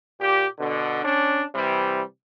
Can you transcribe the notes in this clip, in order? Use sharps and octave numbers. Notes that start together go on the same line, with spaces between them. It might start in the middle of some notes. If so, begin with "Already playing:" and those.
A#2 G4
B2 D3
C#4 D4
C3 E3 G3